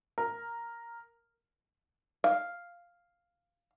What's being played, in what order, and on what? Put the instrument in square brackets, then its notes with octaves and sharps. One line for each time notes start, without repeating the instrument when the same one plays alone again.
[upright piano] A#4
[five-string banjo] F5